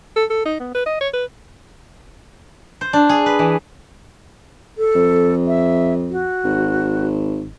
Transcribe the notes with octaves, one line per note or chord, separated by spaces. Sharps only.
A4
A4
D#4
B3
B4
D#5
C#5
B4
C5
D4
G#4
B4
E3
A4
F2
E5
F#4
G#1